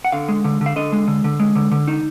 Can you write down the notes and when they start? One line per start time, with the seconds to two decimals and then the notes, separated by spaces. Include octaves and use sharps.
0.05 F#5
0.12 D3 F5
0.29 G#3
0.44 D3
0.61 D3
0.66 F5
0.76 D3 D#5
0.92 G#3
1.08 D3
1.24 D3
1.40 G#3
1.55 D3
1.71 D3
1.88 D#4